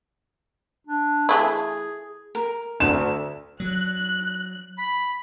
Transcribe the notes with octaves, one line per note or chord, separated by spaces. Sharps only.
D4
E3 A3 E4 G#4
A#4
D2 E7
F#3 F#6
B5